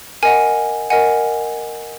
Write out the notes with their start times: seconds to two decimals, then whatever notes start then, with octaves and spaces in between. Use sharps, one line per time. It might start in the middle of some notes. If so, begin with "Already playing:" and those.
0.23 A#4 D#5 F#5 G#5
0.90 A#4 D#5 F#5 G#5